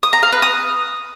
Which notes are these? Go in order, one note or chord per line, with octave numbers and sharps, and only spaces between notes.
D#6
A#5
F5
B4
D#6